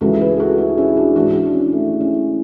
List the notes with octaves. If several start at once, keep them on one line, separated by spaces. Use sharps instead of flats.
C#2 C#3 E3 F#4 A4
G#4 B4
F#4 A4
E4 G#4
C#4 E4
D4 F#4
G#2 E3 D4 F#4
D4
C#4 E4
A3 C#4
C#4 E4